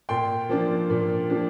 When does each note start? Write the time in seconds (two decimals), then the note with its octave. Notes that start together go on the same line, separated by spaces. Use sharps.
0.09 A#2 G5 C6
0.49 F3 A#3 D4
0.90 A#2
1.30 F3 A#3 D4